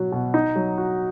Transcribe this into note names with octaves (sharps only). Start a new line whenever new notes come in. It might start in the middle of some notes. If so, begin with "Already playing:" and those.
Already playing: B2 F#3 F#4
B2
D#4
F#3
F#4